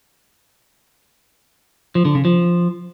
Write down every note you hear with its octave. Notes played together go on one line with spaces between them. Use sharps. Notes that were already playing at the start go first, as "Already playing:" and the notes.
F3
D3
C#3
F3